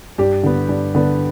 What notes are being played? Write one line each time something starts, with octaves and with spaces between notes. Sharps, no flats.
G2 G4
D3 B3
G2
D3 B3